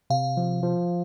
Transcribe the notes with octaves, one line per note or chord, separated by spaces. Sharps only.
C3 F5
F3
F3